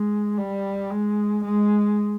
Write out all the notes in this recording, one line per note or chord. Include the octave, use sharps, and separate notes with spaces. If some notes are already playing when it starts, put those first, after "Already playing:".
Already playing: G#3
G3
G#3
G#3